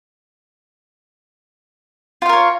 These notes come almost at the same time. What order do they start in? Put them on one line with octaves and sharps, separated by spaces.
F4 F5 A#4 C#5